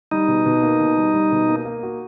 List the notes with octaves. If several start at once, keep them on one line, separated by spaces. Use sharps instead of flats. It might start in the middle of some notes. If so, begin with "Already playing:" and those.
G3 D#4
B2
B2
A#3
B2
G3
G3
B2
A#3
A#3
F#4